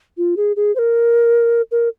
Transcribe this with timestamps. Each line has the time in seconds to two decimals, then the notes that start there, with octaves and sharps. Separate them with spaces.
0.17 F4
0.37 G#4
0.56 G#4
0.75 C5
0.79 A#4
1.71 A#4